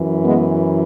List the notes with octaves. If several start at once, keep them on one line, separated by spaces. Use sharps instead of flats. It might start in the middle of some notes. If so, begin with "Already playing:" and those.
Already playing: F#2 E3
G#3 B3